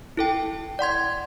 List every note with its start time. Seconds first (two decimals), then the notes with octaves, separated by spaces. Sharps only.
0.17 E4 A4 G5
0.79 D5 F#5 C6 G#6